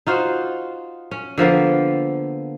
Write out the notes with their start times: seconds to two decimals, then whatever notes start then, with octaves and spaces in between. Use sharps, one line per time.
0.07 D#4 F4 F#4 C5
1.11 C#4
1.38 D3 F3 A#3 B3